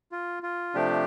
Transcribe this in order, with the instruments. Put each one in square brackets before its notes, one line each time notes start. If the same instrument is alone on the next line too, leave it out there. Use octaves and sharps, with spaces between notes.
[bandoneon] F4
F4
C3 F3 A3 D4 G4